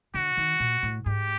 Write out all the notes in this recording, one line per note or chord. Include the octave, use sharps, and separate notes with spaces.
D3 F#4
D#3
A#2
A2
G#2 G4